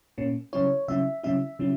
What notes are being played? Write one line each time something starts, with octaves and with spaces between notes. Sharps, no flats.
A#2 A#3 C#4
C#3 F#3 C#4 E4 C#5
C#3 F#3 C#4 E4 E5
C#3 F#3 C#4 E4 E5
C#3 F#3 C#4 E4